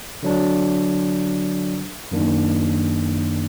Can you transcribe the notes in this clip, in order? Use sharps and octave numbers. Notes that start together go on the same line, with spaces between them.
D3 F#3 D4
F#2 D#3 A#3 D4